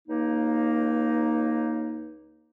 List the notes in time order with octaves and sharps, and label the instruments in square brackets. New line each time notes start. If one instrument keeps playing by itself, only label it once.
[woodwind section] C#2 A#3 D#4